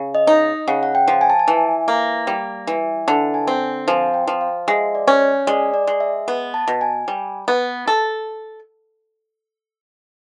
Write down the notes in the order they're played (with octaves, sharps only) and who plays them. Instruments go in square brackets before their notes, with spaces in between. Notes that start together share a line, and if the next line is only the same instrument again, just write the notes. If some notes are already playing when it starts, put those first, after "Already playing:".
Already playing: [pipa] C#3
[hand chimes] D#5
[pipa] D#4
[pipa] C#3 [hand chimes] F#5
[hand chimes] F#5
G5
[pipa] F3
[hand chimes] G#5
A5
G#5
[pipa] E3
A#3
G3
E3
[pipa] D3 [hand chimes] A5
[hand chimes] G#5
[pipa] C4
[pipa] F3 [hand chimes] G#5
[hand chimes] G5
[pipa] F3
[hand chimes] F5
[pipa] G#3 [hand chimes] E5
[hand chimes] D5
[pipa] C#4
[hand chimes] C#5
[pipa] G#3 [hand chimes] D5
[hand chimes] D5
[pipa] G#3
[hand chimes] E5
[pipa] B3
[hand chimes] A5
[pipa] B2
[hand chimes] G#5
[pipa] G3
B3
A4